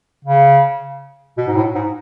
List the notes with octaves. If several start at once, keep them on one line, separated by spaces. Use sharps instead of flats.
C#3
B2
G#2
A2
G#2